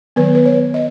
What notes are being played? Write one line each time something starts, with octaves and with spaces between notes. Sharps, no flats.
D#3 F#3 B3 B4
B4
C#5
D#5